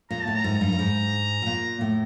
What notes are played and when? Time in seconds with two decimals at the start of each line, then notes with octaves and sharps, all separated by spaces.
0.10 A#2 A#5
0.23 A2 A5
0.35 A#5
0.44 G#2
0.61 G2
0.72 G2
0.79 G#2
1.42 B2
1.46 A#2
1.81 A2